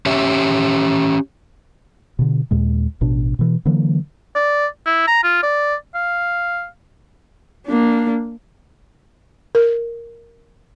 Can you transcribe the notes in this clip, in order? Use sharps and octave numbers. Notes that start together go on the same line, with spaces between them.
C#4 G4 C#5 E5
B2 D3
D#2 A#2 G#3
A1 B2 D4
B2 E3
D3 E3 F#3 A#3
D5
E4
A#5
F4
D5
F5
A#3 D4
A#4